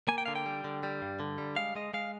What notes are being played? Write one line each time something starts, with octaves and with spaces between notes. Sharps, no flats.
A#3 G#5
G5
D3 F5
G5
G3
D3
G3
G2
D3
G3
G#3 F5
G#3 D#5
G#3 F5